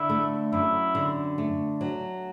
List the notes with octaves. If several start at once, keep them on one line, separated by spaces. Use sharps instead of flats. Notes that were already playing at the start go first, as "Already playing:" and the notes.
Already playing: D3 E4
A3
F#2 E4
D3
A3
F#3